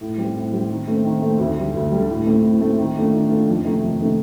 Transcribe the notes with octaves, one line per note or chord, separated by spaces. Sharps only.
A2
G3 C4 G4
A2
G3 C4 G4
D#3
A3 C4
D#3
A3 C4
D2
D3 G3
D2
D3 G3
A2
A3 C4
A2
A3 C4
D#3
A3 D4 F4
D#3
A3 D4 F4
F2
C3 D#3 A3 D#4
F2
C3 D#3 A3 D#4